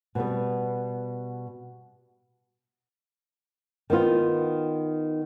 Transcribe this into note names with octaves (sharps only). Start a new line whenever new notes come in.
B2 G3 B3
D#3 B3 F4